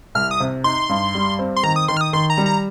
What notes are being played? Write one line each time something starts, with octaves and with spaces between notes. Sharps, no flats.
C2 F6
D#6
C3
D#4 C6
G2
G3
C4
C6
D#3 A#5
D#6
D#3 C6
F6
D#6
D#3 C6
A#5
G3
A#5